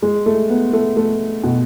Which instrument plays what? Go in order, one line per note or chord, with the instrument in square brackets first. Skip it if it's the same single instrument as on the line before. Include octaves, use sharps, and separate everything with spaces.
[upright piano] G#3
A3
B3
A3
A3
B2